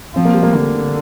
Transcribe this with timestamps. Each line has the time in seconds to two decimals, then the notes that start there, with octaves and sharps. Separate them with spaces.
0.16 F3 C4
0.25 A#3
0.34 G3
0.43 A#3
0.55 D3